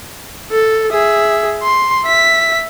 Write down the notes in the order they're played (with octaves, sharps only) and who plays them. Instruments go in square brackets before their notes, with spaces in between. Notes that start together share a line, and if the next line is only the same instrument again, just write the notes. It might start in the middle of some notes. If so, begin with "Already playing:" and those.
[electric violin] A4
G#4 E5
C6
E5 B6